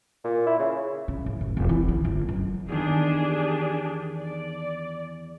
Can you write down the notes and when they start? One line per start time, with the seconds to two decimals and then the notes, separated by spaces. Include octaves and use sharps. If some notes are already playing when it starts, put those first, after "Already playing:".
0.24 A#2
0.46 E4
0.59 C#3
1.08 C#3
1.26 A1
1.41 F#1
1.57 F1
1.69 E3
1.88 C#3
2.05 G1
2.29 F#2
2.69 E2 D#3 D4 G4 G#4
4.18 D5